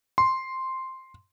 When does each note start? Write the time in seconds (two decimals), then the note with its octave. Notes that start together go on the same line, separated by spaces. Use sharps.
0.18 C6